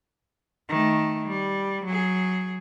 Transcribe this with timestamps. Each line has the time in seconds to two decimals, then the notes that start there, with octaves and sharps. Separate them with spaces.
0.69 D#3 A3
1.27 G3
1.85 F#3 G#4